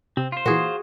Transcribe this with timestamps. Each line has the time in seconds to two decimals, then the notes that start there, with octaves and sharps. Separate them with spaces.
0.17 C3 C4
0.32 F4 C5
0.46 A#2 E3 F#4 G#4